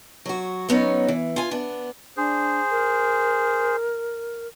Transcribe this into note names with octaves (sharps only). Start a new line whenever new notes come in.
F#3 F#4
F#3 B3 C#4 D#4
E3
F4 G#5
B3 D4
D4 G#4 C5
A#4